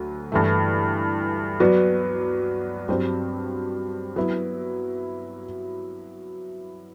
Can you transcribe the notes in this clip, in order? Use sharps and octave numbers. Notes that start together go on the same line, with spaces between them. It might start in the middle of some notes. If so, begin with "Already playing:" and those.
Already playing: D2 F#3
G2 E3 A3
F#3 B3 F#4 B4 D5
G2 F#3 C4 G4 C5
F#3 B3 E4